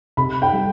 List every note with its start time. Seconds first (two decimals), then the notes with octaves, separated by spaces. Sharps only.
0.17 C3 B5
0.42 G5
0.53 G3